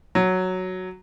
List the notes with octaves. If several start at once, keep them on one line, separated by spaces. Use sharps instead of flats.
F#3